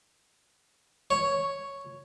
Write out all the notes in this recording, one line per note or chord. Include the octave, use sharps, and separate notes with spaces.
C#5